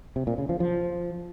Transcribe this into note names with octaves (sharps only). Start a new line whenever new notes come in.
C3
A#2
C#3
F3
F3